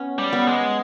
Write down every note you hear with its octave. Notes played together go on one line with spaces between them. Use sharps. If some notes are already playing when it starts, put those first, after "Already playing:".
Already playing: B3 C#4
G3
B3
G#3